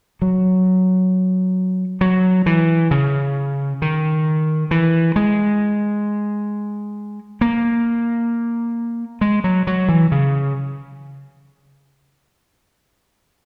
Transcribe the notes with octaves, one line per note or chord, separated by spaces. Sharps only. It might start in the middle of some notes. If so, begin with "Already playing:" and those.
F#3
F#3
E3
C#3
D#3
E3
G#3
A#3
G#3
F#3
F#3
E3
C#3